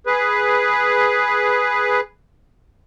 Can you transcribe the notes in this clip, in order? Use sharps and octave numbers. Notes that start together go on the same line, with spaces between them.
G#4 B4